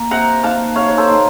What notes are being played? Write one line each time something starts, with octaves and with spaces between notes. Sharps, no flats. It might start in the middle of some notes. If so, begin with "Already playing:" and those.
Already playing: A#3
C3 F#5 A#5
D#3 A#3 F5 A5
C3 C#5 F5
C#5
A4 C5
D#3 A#3